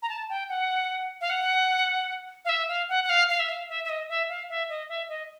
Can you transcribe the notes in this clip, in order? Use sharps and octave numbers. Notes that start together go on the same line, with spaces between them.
A#5
A5
G5
F#5
F5
F#5
F5
E5
F5
F#5
F#5
F5
F5
E5
F5
E5
E5
D#5
E5
F5
E5
D#5
E5
D#5